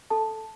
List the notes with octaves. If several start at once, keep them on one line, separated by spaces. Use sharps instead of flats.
A4 A5